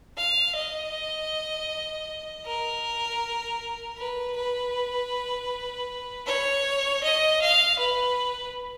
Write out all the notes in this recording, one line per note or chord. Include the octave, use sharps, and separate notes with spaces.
F5
D#5
A#4
B4
B4
C#5
D#5
F5
B4